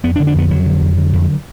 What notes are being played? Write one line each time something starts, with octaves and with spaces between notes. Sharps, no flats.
F2 B3
D4
D3
D4
F2 B3
F2 F#3
D3
F2
D3
F2